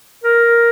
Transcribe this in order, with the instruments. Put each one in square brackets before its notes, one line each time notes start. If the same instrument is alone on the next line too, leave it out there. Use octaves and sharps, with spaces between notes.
[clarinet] A#4